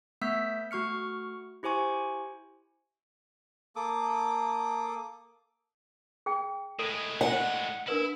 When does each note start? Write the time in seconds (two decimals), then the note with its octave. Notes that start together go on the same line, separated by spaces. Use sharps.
0.21 A3 B3 E5 E6 G6 B6
0.71 A3 F#4 C#6 F6 C#7
1.63 E4 G4 C5 G#5 C#6
3.76 A#3 A4 D6 D#6
6.26 G#4 G5
6.79 A2 G#3 A4
7.21 F#5
7.88 D4 E4 A#4 B4